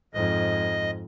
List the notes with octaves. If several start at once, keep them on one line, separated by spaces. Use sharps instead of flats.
F2 G#2 D#5